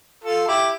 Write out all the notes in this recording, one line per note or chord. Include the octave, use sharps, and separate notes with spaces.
F4 A4
E4 G4